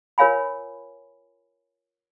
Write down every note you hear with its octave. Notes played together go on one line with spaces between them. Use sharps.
F4 A#4 C#5 F5 G#5 B5